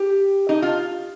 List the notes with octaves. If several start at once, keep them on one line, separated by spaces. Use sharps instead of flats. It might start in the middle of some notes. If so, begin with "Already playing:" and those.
Already playing: G4
D#4
F4